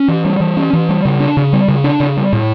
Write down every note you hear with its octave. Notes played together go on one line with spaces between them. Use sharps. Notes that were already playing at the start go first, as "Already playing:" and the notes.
Already playing: C#4
E3
G3
E3
C#4
E3
G3
C#3
D4
C#3
G3
C#3
D4
C#3
G3
A2